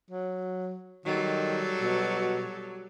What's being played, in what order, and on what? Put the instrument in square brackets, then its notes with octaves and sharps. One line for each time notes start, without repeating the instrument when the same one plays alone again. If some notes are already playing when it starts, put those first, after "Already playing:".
[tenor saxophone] F#3
[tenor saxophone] D#3 [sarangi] F#3 [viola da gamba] G3 A4
[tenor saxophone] B2